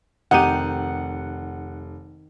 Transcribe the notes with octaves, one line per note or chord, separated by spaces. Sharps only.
F1 D#3 D#4 G4 F#5 D#7